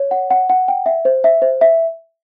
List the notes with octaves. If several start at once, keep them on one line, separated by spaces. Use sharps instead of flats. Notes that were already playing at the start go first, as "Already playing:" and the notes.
Already playing: C#5
F#5
F#5
F#5
G5
E5
C5
E5
C5
E5